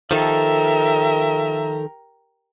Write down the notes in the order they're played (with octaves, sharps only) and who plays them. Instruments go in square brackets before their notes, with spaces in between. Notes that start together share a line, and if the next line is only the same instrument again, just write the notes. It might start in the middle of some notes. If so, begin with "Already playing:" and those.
[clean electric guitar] D#3 F3 [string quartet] G4 A#4 [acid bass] A4 [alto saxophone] E5